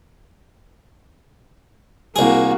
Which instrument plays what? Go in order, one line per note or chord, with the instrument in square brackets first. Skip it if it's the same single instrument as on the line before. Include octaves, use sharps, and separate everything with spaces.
[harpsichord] C2 G#4 [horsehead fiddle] A#3 F#4